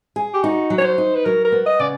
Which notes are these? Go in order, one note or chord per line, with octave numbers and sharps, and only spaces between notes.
G#4
G4
D#4 F#4
F#3
C#5
C5
D#4
B4
F#3 A#4
A#4
B3
D#5
C#3 D5